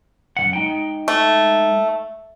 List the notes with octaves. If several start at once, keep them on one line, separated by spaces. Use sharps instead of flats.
F#2 D#3 F#5
G#3 D#4 G5
A3